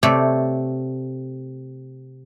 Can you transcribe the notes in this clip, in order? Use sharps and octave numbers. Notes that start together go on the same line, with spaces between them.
C3 A3 C#5 D5